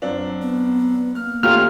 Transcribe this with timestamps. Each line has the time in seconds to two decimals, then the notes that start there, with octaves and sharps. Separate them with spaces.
0.02 F#2 C4 D4
0.42 B3
1.15 A#3 F6
1.43 G#1 A3 C#4 F4 G4 A#5 F6